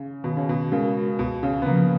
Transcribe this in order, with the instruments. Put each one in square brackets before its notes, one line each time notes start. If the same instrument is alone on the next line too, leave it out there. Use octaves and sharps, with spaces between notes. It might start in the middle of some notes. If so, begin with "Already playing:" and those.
Already playing: [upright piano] C#3
[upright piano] B2 [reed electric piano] D#3
[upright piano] C#3
B2
[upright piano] C#3 [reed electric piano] G#3 C#4 F#4 A#4
[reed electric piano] C#2 [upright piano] B2
[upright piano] C#3
B3
[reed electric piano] C#3 F3 [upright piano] A#3